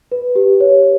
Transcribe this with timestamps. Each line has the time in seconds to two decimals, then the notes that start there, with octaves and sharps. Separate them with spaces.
0.12 B4
0.36 G4
0.60 C#5